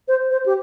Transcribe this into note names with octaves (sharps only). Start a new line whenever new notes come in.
C5
C5
G4